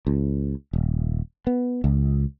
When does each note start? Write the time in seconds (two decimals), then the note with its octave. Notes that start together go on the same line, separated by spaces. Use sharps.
0.07 C#2
0.73 D#1
1.47 B3
1.84 C#2